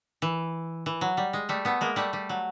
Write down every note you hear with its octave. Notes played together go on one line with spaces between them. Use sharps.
E3
E3
F#3
G3
G#3
G3 A3
A3 B3
G#3 A#3
G3 A3
G3
F#3